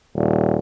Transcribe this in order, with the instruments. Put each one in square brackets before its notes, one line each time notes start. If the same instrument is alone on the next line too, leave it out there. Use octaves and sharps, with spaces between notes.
[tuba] D#1